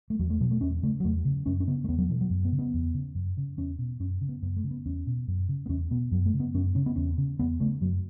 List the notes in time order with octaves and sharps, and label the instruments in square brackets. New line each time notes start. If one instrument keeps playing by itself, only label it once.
[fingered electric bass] A3
E2 F#3
A3
B2 F#3
A3
E2 C#4
C#3 A3
F#3
E2 A3
C#3
F#2 C#4
C#4
C#3 B3
A3
E2 B3
F#3
B2 E3
F#3
F#2
B3
C#3
B3
E2
C#3
F#2
C#3
E2 C#4
B2
F#2 C#4
C#3
B3
F#2 B3
A3
C#3
B3
E2 C#4
B2
F#2
C#3
B3
E2 C#4
B2 B3
F#2 F#3
A3
C#3
B3
F#2 C#4
C#3 C#4
B3
E2 C#4
C#3
E2 B3
C#3 A3
F#2 F#3